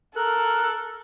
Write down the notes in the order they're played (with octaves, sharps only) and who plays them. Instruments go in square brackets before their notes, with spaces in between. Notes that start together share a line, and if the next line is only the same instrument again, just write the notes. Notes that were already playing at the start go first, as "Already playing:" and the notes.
[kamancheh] A4 [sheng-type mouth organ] A#4 F#6